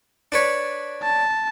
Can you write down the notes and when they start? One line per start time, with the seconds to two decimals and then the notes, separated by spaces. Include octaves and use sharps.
0.32 D4 B4 C#5
1.02 A5